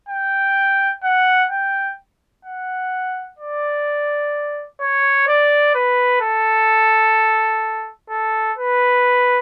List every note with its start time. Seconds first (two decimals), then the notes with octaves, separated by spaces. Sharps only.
0.09 G5
1.04 F#5
1.51 G5
2.45 F#5
3.39 D5
4.81 C#5
5.28 D5
5.75 B4
6.21 A4
8.10 A4
8.58 B4